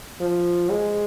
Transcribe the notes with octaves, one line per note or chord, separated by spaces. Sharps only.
F3
G#3